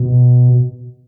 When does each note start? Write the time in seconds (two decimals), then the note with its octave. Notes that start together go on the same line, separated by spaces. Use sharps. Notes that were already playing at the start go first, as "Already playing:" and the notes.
Already playing: B2